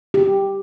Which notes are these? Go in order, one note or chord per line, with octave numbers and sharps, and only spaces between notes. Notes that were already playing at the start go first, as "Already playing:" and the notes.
G4